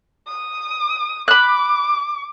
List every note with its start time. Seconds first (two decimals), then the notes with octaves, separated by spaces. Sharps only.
0.27 D#6
1.28 B5 D6 F#6